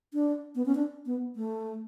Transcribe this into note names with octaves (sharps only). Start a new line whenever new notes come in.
D4
B3
C#4
D4
B3
A3